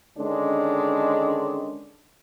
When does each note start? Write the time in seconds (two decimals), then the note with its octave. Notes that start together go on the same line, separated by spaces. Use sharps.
0.18 D3 D#3 G#3 C#4 D4